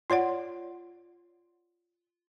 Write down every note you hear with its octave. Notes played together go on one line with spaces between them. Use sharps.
F4 C#5 D5 F#5